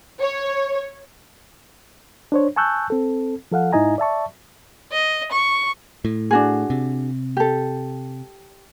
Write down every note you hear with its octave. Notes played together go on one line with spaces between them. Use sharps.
C#5
D4 C5 C#5
G#5 A5 C#6 E6 F#6 G6
C4 A4
F3 A4 F5 F#5
G#2 D#4 E4 D#5 G#5 A#5
D5 E5 A5 C#6
D#5
C#6
A2
D4 F#4 G#4
C3
G4 A4